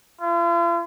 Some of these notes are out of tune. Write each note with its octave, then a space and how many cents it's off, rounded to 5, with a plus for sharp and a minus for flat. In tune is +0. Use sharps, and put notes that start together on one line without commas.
F4 -45